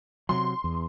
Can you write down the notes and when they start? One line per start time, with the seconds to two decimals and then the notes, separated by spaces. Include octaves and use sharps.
0.29 C3 F#3 C6
0.64 E2